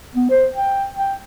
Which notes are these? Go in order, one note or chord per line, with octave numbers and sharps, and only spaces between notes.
B3
C5
G5
G5